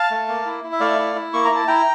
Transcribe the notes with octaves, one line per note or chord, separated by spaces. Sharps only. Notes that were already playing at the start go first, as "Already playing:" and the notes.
Already playing: F5 A5
A3
A#3
E4
E4
E5
A3 D5 F5
E4
E4
A#3 C#6
A#5
E4 A5
E4 G5 A#5